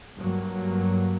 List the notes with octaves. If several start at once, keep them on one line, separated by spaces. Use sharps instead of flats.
G2 F#3 A#3